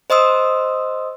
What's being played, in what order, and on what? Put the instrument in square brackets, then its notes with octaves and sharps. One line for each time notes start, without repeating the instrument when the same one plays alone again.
[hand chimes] C5 D#5 C6 D#6 E6